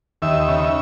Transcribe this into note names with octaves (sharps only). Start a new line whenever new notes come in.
D#2 E5
C#3